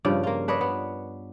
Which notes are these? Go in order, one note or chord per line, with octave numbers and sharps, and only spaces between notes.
G2 C#3 F3 D5
A#3 F4
D4 B4 C#5 D#5
B3